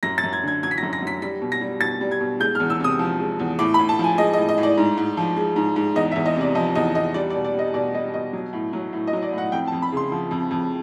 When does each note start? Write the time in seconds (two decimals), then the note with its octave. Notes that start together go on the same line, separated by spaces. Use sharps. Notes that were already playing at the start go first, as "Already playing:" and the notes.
0.03 F#2 A#6
0.18 A6
0.23 F#2
0.33 G#6
0.43 D3 G#6
0.63 F#3 G#6
0.71 B6
0.78 A#6
0.83 F#2
0.93 A#6
1.02 F#2 B6
1.22 G3 B6
1.42 B2
1.52 A#6
1.61 G3
1.81 B2 A6
2.01 G3
2.11 G#6
2.21 B2
2.40 G#3 G6
2.55 F6
2.60 E2
2.70 E6
2.80 C3 D#6
2.99 F3
3.20 G#3
3.39 E2
3.59 A2 D6
3.74 B5
3.79 A2
3.89 A5
3.99 F3 G#5
4.18 G#3 D#5
4.33 D#5
4.38 A2
4.49 D#5
4.58 A2
4.63 D5
4.78 G#2
4.98 G#2
5.17 F3
5.36 G#3
5.56 G#2
5.76 G#2
5.96 E2 D#5
6.11 E5
6.16 E2
6.26 D#5
6.36 C3 D5
6.55 F3 D#5
6.75 E2 D#5
6.95 E2 D#5
7.14 G3 D5
7.30 D5
7.34 B2
7.44 D5
7.54 G3 D#5
7.74 B2 D5
7.94 G3 D#5
8.14 B2 D#5
8.33 F#3
8.53 A2
8.73 F#3
8.93 A2
9.07 D#5
9.13 F#3
9.22 D5
9.33 A2
9.38 F#5
9.52 F2 G5
9.67 A5
9.72 F2
9.82 B5
9.92 C#3 C6
10.12 F3
10.31 F2
10.51 F2